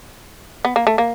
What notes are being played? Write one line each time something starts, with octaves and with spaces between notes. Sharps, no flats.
B3
A#3
A3
A#3